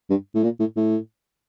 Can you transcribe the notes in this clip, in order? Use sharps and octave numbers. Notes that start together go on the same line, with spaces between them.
G2
A2
A#2
A2
A2